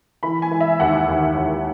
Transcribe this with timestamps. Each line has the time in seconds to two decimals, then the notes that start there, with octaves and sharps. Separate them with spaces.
0.23 E3 B5
0.42 G#5
0.51 E3
0.61 E5
0.80 D#2 F#5
1.08 D#2
1.37 D#2